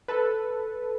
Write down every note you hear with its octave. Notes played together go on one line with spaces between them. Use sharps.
A4 B4